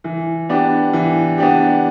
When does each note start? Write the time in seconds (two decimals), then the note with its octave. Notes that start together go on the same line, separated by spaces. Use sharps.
0.04 E3
0.49 B3 D4 G4
0.93 E3
1.38 B3 D4 G4